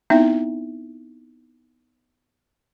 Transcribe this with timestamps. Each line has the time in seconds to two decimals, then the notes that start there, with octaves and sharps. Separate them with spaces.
0.10 B3 C4 D#4 E4 E5